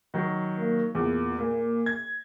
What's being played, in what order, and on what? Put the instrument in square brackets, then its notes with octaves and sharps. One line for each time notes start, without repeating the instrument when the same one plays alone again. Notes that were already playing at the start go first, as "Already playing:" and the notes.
[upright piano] D#3 F#3
[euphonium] A#3
[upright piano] E2 [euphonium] A#2
[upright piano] A#2 [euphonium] A#3
[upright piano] G#6